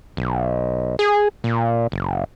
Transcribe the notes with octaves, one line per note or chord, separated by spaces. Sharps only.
B1
G#4
A#2
F#1